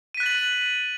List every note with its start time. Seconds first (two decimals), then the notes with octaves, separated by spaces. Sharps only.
0.15 D#7
0.17 B6
0.20 F#6
0.23 A6
0.26 F#7